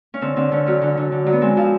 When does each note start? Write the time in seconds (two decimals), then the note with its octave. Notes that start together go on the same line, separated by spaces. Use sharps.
0.14 C#4
0.21 D3 C4
0.36 D3 C4
0.51 D3 C#4
0.66 F#3 C#4
0.82 D3
0.97 D3
1.12 D3
1.26 F#3
1.33 B3
1.42 G#3 C4
1.57 F3